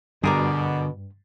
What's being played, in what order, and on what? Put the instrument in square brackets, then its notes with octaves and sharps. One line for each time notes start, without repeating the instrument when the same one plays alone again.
[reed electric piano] G2 [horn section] B2 [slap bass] D3 [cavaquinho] G#4 A#4 D5